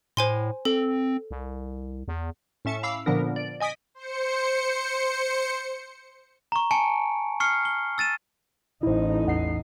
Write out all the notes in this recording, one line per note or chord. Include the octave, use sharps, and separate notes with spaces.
A2 C5 G#5 C6
C4 A4
C2
E2
A2 C#4 E5 A5 C#7
F5 B5 D6 E6 C7
A#2 D3 F3 B3 D4 A#4
D5
D#5 G#5 D#6 B6 D7
C5 C#7
A#5 C#6
G#5 A5 C#6 C#7 D7
C#6 F6 C7 C#7
G7
E6 A6 D#7 E7
A1 D#4 E4 C5
E2 F#5 C7